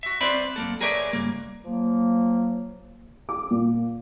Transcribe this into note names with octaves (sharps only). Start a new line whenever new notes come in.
F#4 E5
C4 B4 C5 D5 E5 B5
F#2 A#3 A4
G#4 A#4 B4 C#5 D5 E5
C#2 G2 A#3
F3 F#3 A#3
D6
A#2